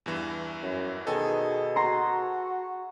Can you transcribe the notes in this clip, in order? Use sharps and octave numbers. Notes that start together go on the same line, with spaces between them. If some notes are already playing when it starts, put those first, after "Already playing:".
E2 G2 E3
F#2
B2 D#3 G#4 A4 G#5
F#4 A#5 C6 C#6